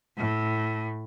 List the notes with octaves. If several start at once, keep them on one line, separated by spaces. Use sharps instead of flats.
A2